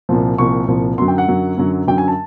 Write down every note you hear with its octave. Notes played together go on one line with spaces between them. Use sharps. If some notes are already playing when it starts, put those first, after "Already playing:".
C2 A#2 F3
C2 A#2 F3 C#6
C2 A#2 F3
F#2 D3 F#3 C6
G5
F#5
F#2 D3 F#3
F#2 D3 F#3
F#2 D3 F#3 G5
G#5
A5